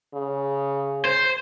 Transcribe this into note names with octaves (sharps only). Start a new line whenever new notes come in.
C#3
C5